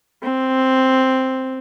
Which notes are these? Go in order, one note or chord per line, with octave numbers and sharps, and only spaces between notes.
C4